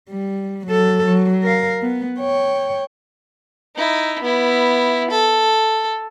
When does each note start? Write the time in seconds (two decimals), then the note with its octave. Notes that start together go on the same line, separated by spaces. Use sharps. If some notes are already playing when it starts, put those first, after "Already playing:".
0.10 G3
0.67 F#3 A4
1.05 F#3
1.43 A#4 F5
1.82 B3
2.19 C#5 G5
3.76 D#4 E4
4.22 B3 E4
5.10 A4